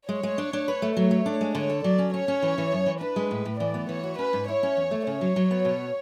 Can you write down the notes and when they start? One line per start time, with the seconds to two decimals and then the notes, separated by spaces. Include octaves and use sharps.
0.09 G#3 C#5
0.23 G#3
0.38 D4
0.53 D4
0.68 B4
0.82 A3
0.96 F#3 C#5
1.11 A3
1.26 D4
1.41 G#3
1.55 D3 C#5
1.69 A4
1.84 F#3 D5
1.98 C#4
2.14 C#4 C#5
2.28 C#4
2.42 E3
2.58 E3
2.72 F#2
2.86 E3
3.01 D4 B4
3.16 G#3
3.31 A2
3.45 A2
3.59 E3 D5
3.74 B3
3.89 E3 C#5
4.03 F#4
4.18 C#4 B4
4.33 G#2
4.48 E4 C#5
4.63 C#4
4.77 E2
4.91 A3
5.06 C#3 C#5
5.21 F#3
5.36 F#3
5.51 B3
5.65 B2